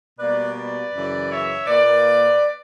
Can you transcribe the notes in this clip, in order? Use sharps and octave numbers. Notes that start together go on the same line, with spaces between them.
B2 G3 A#3 B4 D5
B4 D5
F#2 C#3 E3
C#5 E5
A#2 A#3 B4 D5